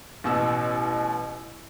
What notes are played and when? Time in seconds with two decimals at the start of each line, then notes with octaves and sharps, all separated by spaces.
0.24 A1 B2 E6